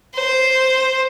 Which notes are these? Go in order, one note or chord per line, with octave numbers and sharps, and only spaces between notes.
C5